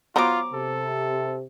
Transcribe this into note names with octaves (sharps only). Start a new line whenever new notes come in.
F#3 B3 F4 C5 A#5 D6
C3 A4